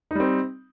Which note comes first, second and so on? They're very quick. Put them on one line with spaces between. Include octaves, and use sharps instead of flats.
D#4 G3 C4